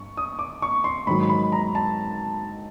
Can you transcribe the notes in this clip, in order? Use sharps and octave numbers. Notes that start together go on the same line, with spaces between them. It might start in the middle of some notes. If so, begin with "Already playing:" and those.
Already playing: G2 C#6
D#6
D6
C#6
C6
G#2 D#3 F#3 B5
B5
A#5
A5